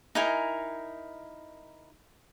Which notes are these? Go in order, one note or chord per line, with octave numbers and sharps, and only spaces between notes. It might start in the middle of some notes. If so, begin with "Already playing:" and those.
D#4 E4 A#4 G#5